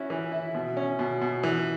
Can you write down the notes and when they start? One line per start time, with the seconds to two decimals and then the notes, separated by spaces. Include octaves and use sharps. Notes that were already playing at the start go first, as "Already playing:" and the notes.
Already playing: C#4 E4 F#4
0.10 E3
0.32 E4
0.54 B2
0.77 C#4
0.99 B2
1.21 B2
1.43 E3